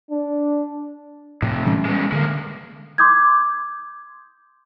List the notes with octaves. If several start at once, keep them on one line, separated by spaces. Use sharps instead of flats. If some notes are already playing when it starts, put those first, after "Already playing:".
D4
F2 A2 C3
E3 G3 C#4
G#3 B3
D3 G#3 A#3
C6 D6 D#6 G6 G#6